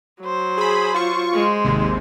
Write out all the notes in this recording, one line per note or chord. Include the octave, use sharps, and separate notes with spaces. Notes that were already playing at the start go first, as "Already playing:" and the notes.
F#3 C5
G#4 B5
F4 C#6
G#3 C5
G#1 D#2 C3